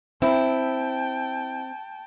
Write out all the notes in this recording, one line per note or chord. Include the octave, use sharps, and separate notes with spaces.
C4 E4 G5 A5